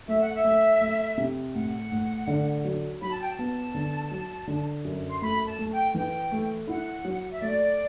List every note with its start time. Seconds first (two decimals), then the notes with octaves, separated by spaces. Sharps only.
0.08 A3 E5
0.21 F#5
0.35 E5
0.44 A3
0.81 A3
1.18 C3
1.55 A2 F#5
1.92 A2
2.27 D3
2.65 F#3
3.02 F#3 B5
3.10 A5
3.20 G5
3.29 A5
3.39 B3
3.74 D3
4.11 F#3
4.47 D3
4.85 F#2
5.10 C6
5.22 A3 B5
5.45 A5
5.59 A3
5.71 G5
5.95 E3 G5
6.32 A3
6.67 E4 F#5
7.05 F#3
7.32 E5
7.41 A3 D5